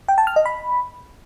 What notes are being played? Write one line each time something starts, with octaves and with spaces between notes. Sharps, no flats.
G5
A5
F6
D#5
B5